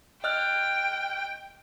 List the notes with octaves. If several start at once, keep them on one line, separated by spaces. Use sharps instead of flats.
D#5 G5 F6 F#6